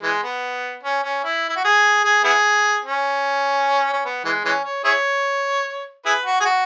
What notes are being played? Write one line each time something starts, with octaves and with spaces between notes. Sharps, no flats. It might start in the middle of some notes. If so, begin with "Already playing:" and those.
E3 G#3
B3
C#4
C#4
E4
E4
F#4
G#4
G#4
B3 E4 G#4
C#4
C#4
B3
E3 G#3
E3 G#3 C#4
C#5
E4 G#4 C#5
E4 G#4 B4
F#4
G#4
F#4